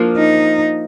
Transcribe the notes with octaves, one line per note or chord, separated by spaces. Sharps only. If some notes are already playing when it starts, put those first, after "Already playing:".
Already playing: F3 A#3 D4 F4
D#4